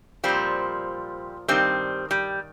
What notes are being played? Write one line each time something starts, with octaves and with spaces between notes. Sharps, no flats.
A#2 F3 G3 C4
G2 D#3 G3 C4
G3